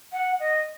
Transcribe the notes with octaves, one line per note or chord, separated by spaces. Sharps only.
F#5
D#5